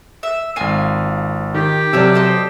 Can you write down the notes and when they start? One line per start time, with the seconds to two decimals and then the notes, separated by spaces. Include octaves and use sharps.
0.23 E5
0.56 G#1 A#3 F4 G#5 D#7
1.54 D#3 G4
1.93 C3 F#3 A4 A#4 C#5 D5
2.14 A4 C5 D#5